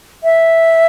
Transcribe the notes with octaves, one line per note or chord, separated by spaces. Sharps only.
E5